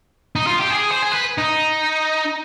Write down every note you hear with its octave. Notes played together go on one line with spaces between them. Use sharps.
D#4
F4
G4
G#4
C5
G#4
B4
D#4